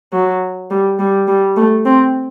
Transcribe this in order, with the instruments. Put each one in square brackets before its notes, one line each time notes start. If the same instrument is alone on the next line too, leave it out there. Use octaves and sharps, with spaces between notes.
[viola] F#3
G3
G3
G3
A3
C4